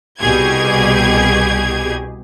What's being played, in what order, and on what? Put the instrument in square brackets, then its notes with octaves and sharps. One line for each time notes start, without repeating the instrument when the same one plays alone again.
[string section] C2 B2 G4 G#4 G#6